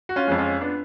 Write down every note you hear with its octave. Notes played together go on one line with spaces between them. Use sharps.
F#4
C#4 F4
F2 F3 G#3
C#4 F4
B3 D4